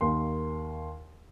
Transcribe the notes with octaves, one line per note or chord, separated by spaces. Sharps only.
D#2 A#3 C6